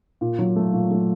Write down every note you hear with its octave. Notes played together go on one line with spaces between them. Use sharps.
A#2
F#3
A3
A#2
A3